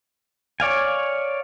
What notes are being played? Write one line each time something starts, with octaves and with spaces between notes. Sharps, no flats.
C#5 D5 F5 G#5